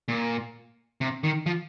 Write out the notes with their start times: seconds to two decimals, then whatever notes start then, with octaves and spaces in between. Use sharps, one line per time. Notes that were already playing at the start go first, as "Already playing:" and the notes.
0.08 A#2
1.01 C3
1.24 D#3
1.46 F3